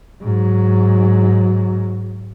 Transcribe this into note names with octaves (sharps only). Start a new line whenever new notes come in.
G#2 F#3